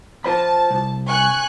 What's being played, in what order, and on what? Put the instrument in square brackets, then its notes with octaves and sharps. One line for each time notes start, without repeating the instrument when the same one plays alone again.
[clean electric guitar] F4 C5 B5 [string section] A5
[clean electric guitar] C2
[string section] G#5 C#6 F#6